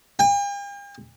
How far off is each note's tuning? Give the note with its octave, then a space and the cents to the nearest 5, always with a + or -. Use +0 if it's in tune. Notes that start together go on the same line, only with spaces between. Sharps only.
G5 +45